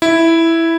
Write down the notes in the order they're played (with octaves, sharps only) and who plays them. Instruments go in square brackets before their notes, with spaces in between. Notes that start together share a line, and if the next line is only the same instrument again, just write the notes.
[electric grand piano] E4